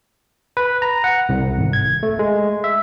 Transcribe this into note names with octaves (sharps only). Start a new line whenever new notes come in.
B4
A#5
F#5
C2
G#1
G#6
A3
G#3
E5